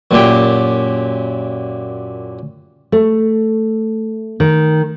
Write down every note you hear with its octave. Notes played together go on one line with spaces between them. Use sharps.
F#2 A#2 G4
A3
D#3